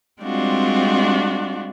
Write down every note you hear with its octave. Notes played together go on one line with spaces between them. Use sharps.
G3 G#3 C4 D4 F4 F#4